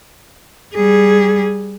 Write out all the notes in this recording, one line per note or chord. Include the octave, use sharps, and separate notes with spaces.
G3 G#4